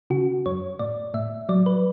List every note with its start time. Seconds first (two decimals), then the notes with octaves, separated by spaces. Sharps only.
0.10 C#3 F#4
0.46 F#2 C#5
0.79 A2 D5
1.14 A2 E5
1.49 F#3 D5
1.66 B4